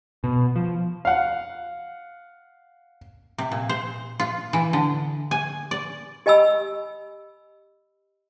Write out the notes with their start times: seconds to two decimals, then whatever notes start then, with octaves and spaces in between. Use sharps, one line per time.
0.24 B2
0.56 F3
1.05 F5 F#5
3.38 C3
3.52 A#2
3.69 C5
4.20 F4
4.53 E3
4.73 D3
5.31 G#5
5.71 D5
6.26 G4 D#5 G#5 B5 E6